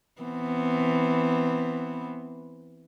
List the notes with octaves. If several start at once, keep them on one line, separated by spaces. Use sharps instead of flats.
E3 B3 C4